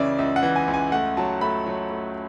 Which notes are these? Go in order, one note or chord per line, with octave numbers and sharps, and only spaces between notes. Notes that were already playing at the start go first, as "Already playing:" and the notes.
Already playing: C#2 C#3 E3 D5 E5
C#2 E5
F#5
E3
G#5
C#2
G#5
A3 F#5
F#3 A5
A3 B5
F#3
A3